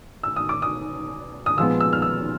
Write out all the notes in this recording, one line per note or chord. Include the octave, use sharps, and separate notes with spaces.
E6
D#6
D6
D#6
D#6
A#2 F3 G#3 B3 E6
E6
F6
E6